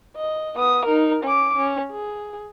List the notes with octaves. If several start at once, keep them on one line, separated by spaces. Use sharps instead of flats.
D#5
B3 D#6
D#4 A#4
C#4 D6
C#4
G#4